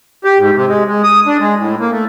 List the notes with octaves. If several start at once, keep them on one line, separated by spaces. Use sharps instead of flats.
G4
G#2
C3
G#3
G#3
D#6
D4
G#3
A2
A#3
A3